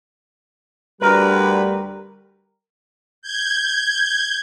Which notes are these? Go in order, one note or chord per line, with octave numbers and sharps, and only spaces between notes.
D2 G3 A#4 B4
G6 G#6